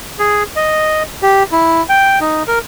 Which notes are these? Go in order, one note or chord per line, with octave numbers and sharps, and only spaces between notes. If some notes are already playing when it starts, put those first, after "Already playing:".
G#4
D#5
G4
E4
G5
D#4
A#4